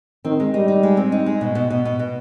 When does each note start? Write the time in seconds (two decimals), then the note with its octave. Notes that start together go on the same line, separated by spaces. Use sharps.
0.24 D#3 C4
0.40 G#3
0.54 G3 D#4
0.68 D#4
0.83 G#3
0.97 C4
1.12 D#4
1.26 G#3
1.41 B2
1.55 B2
1.70 B2
1.85 B2
1.99 B2